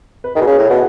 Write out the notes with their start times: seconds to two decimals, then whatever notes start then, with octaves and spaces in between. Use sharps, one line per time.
0.24 B4
0.36 D#3 G#4
0.41 B2
0.47 C#3 G#4
0.58 A2
0.70 B2 F#5